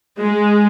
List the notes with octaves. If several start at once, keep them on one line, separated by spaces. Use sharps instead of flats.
G#3